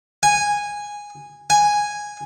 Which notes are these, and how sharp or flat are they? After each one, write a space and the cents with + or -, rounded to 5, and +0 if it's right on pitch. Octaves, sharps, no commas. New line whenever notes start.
G#5 -10
G#5 -5